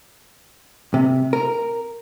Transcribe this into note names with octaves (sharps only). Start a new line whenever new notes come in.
C3
A#4